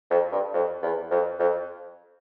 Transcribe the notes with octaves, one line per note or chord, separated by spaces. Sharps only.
F2
G2
F2
E2
F2
F2